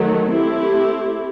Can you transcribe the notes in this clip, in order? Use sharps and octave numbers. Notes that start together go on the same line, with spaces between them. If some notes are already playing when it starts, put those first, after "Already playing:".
Already playing: D#3 F#3 A3
A3 C4 E4 G4